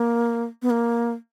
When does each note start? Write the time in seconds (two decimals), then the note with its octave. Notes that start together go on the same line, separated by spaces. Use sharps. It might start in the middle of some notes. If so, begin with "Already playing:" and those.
Already playing: A#3
0.62 B3
0.70 A#3